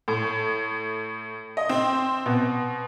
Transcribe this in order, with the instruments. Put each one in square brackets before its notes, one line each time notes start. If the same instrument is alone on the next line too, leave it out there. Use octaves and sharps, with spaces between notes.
[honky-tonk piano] A2
D#5
C4
B2